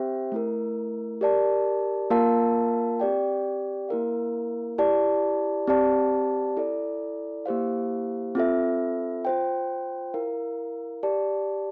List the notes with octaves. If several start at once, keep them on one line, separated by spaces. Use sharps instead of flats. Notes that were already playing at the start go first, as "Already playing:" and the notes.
Already playing: C4 G4 C5 E5 G5
A3 E4 A#4
G4 A#4 D5 A5
A#3 F4 A#4 F5 A5
C4 G4 D5 G5
A#3 E4 A#4 F5
E4 G4 D5 A5
C4 G4 D5 A5
E4 A4 D5
A#3 E4 G4 C5 F5
C4 F4 A4 E5
F4 C5 G5
E4 A#4 F5
G4 D5 A5